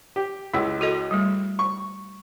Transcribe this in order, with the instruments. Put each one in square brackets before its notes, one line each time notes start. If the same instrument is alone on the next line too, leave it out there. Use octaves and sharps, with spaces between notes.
[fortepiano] G4
[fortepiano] C#2 E6 [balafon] E4
[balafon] F#4 A4 D#5
G3 A3
[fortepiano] C#6